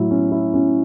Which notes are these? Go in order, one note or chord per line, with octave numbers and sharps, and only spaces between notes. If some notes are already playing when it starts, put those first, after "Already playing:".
Already playing: A2 F#3 E4
C#4
E4
C#4